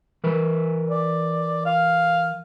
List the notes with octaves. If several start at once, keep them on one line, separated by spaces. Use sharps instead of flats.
E3 A#4 B4
D5
F5